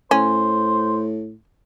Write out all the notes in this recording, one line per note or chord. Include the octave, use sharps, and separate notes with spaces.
A2 C#4 C5